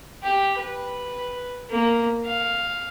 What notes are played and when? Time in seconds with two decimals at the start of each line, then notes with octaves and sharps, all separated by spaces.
0.23 G4
0.58 B4
1.70 A#3
2.25 F5